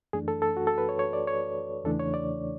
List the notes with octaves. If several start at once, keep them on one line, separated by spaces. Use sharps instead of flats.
F#2 E3 A3 D4 G#4
A4
A4
F#4
A4
B4
C#5
C#5
D5
C#5
E2 C#3 E3 A3 D4 A4
C#5
D5